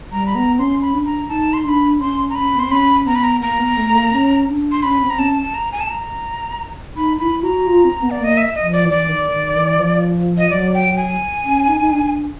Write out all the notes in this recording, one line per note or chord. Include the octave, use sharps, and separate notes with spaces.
G3 A#5
B5
B3 A#5
C#4 C6
B5
D4
A#5
D#4 A5
C6
D4 B5 C6
C#4 C6
A#5
C#4 B5
B3
C4 C6
C#4 B5
B3 A#5
B5
A#5
A#3 A#5
B3
A3
A#3
C#4
D4
C6
C#4 B5
C4
A#5
C#4 A5
A5
A#5
G#5
A5
A#5
D#4 B5
E4 B5
F#4 A#5
F4
C4
B3
D5
A#3 D#5
E5
D#5
F3
D5
E3
D5
D#3
D#3
E3
F3
D#5
F#3 D5
G5
G#5
C#4
D#4
D#4
D4